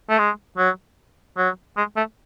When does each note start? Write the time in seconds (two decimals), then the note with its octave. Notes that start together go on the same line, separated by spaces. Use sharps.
0.10 A3
0.18 G#3
0.57 F#3
1.37 F#3
1.77 G#3
1.96 A3